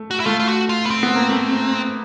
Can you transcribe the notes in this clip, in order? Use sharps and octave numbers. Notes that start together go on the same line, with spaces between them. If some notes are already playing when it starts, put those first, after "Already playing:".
Already playing: A3
F#4
E4
A3 F4
F4
F#4
F4
B3
C4
B3
A#3
A3